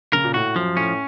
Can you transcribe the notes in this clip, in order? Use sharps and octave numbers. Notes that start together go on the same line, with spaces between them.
C#3 A#4
A#2
A2 F#4
F#2 F3
A2 C#4